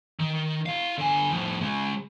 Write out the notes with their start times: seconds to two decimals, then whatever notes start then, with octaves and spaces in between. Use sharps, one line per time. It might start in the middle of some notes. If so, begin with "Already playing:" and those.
0.20 D#3
0.66 E4 F5
0.98 D3 G#5
1.30 F2 A2
1.61 C#3 G#3